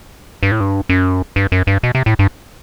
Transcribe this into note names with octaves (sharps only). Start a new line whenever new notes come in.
G2
A2
G2
F#2
G2
F#2
G2
B2
C3
A2
G2